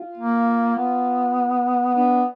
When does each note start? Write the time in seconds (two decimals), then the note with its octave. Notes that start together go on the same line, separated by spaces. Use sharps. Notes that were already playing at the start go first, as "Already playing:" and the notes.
Already playing: F4
0.18 A#3
0.76 B3
1.94 B3 D4